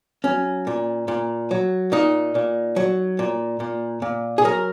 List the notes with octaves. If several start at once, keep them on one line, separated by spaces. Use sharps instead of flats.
F#3 C#4
A#2
A#2
F#3
A#2 D#4
A#2
F#3
A#2
A#2
A#2
G#4
F#3 A#4